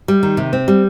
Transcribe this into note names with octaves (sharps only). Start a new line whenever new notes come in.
G3
D#3
C3
C4
G3